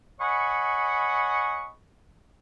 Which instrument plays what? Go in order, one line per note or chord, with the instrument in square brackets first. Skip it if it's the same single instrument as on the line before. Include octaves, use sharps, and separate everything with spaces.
[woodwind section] C#5 D#5 F#5 G#5 B5 C#6